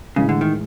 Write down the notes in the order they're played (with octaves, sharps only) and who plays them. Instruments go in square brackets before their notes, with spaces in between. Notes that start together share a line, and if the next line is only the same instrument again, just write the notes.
[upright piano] A2 E3 G#3 [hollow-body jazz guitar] C#3
[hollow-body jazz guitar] D3
D#3